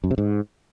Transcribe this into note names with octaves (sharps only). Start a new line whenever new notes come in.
F#2
C3
G#2